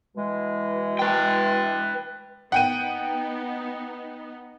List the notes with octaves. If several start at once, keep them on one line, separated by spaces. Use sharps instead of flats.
B2 E3 G#3
B4 G5
B3 D#4 F#5 G5 D#7